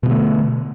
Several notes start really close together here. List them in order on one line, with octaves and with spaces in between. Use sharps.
B2 F3 D3 A3